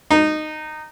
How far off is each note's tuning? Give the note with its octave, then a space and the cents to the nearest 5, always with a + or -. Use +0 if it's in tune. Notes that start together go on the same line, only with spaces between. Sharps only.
D#4 -15